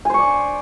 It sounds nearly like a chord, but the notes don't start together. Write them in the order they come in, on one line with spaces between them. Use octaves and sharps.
G#5 C5 C#6 D5